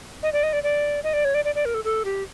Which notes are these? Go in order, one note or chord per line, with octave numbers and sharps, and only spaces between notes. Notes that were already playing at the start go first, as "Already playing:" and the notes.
D#5
D5
D#5
D5
D5
D#5
D5
C#5
D5
D5
D5
A#4
A4
A4
G4